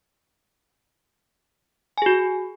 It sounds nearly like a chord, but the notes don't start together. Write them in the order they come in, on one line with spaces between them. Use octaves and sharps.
G#5 G#4 F#4